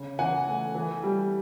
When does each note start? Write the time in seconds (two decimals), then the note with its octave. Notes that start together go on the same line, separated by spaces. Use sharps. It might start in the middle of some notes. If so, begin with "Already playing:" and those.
Already playing: C#3
0.19 E3 F#5 G#5
0.47 A3
0.75 E3
1.03 G3